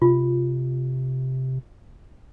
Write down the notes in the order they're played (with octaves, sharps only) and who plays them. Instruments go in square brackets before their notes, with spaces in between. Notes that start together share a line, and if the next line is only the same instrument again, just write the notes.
[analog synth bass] C3 [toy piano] F4